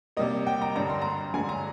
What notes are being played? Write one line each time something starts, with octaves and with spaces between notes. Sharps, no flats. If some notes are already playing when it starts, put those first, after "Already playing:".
C3 G3 A#3 D#5
G5
A#5
G2 D3 G3 A#5
C6
A#5
G2 D3 G#3 G#5
A#5